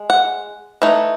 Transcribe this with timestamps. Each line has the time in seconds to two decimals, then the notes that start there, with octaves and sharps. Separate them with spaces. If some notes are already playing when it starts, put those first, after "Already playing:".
Already playing: G#3
0.10 F#5
0.82 E3 A3 D#4